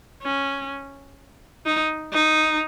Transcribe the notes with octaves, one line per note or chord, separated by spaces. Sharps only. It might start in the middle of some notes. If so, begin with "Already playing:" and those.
C#4
D#4
D#4